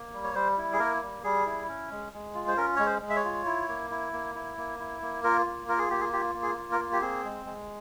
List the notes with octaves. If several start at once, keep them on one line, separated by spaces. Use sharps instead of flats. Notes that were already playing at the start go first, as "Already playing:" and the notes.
Already playing: A#3
G3
C#5
G3 C5
E4
G#4
A#3 A#4
G3
G3 G#4
E4
C#4
G#3
G#3
F4
C5
C#4 A#4
G#3 C#5
C5
G#3
E5
C#5
F4
E4
A#3
E4
A#3
E4
A#3
E4
A#3
F4 A#4
A#3
F4 A#4
G#4
A#3 G4
G#4
F4 G4
A#3
G#4
F4
A#4
A#3
G4
C4 G#4
G#3
G#3